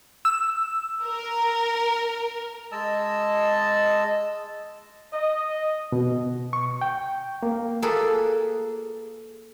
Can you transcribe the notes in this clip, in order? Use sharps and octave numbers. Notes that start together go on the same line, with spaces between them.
E6
A#4
G#3 D#5 A5 E6
D#5
B2
C#6
G5
A#3
A#3 F4 G#4 A4 B4